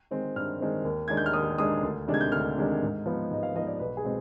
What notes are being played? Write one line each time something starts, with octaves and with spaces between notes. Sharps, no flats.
D#3 G#3 C4
G2 F6
D#3 G#3 C4
D#2
D#3 G#3 D4 G#6
G6
F6
D#2 D#6
D#3 G#3 D4 D#6
D2
C3 D#3 G#3 D4
G#6
G6
D2 F6
C3 D#3 G#3 D4
G#2
F3 B3 D#4
G#2 D#5
F5
F3 B3 D#4 D#5
D5
B1 B4
G#4
B2 G#3 C4